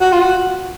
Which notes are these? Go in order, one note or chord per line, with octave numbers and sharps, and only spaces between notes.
F#4
F4
F#4